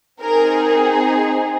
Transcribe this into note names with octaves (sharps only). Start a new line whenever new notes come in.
C4 D#4 G#4 A#4